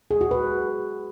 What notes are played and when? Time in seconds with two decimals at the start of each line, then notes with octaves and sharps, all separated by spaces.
0.11 G#4
0.21 F#4
0.31 B4